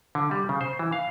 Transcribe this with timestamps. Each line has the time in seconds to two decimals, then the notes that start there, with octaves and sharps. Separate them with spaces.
0.15 D3
0.31 G3
0.49 C#3
0.61 C5
0.79 E3
0.92 F5